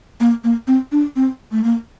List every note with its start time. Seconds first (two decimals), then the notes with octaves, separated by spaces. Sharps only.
0.20 A#3
0.44 A#3
0.68 C4
0.92 D4
1.16 C4
1.52 A3
1.64 A#3